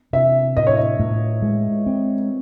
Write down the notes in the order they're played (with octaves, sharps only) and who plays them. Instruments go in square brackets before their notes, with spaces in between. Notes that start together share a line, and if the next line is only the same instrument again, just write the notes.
[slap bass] C3 [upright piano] E5
[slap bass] A2 [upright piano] D#5
[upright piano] C#5
D#5
[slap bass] A2
G#3
C4